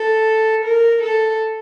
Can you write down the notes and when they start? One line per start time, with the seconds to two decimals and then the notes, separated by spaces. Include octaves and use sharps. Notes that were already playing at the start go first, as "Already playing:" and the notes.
Already playing: A4
0.65 A#4
1.02 A4